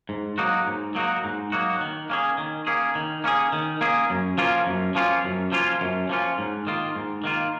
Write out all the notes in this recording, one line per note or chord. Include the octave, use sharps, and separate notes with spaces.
G#2
F#3 A#3 D#4 F#4
G#2
F#3 A#3 D#4 F#4
G#2
F#3 A#3 D#4 F#4
D#3
A#3 C#4 G#4
D#3
A#3 C#4 G#4
D#3
A#3 C#4 G#4
D#3
A#3 C#4 G#4
F#2
F3 A#3 C#4 F4
F#2
F3 A#3 C#4 F4
F#2
F3 A#3 C#4 F4
F#2
F3 A#3 C#4 F4
G#2
D#3 A#3 F4
G#2
D#3 A#3 F4